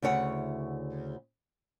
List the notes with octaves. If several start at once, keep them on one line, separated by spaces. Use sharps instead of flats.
D2 C#3 E4 C#5 F#5